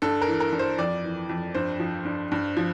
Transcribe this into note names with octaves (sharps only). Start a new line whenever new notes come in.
G2 A4
A#4
E3
A#4
G2
C5
F2 D5
E3
F2
G2 C5
F3
G2
G2
F3